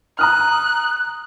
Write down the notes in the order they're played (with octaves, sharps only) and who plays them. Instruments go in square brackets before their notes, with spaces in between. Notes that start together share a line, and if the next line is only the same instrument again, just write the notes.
[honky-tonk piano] A#5 D#6 F6 [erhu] F#6